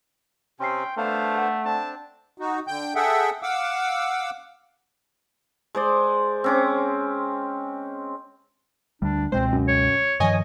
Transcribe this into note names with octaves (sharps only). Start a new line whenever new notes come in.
C3 C4 C#4 G5 C6 C7
A3 B3 D4 C5 F5
A4 F#5
C4 D4 A5
D#4 F#4
D3 G5 G6
G#4 A4 E5 F#5 G5
F5 F#5 D6 E6
G#3 C5 D5
C4 C#4 D6
D2 G3 D4
C#2 B2 G#3 C4 C5
F#2
C#5
G2 D#3 F3 C#5 D#5 G#5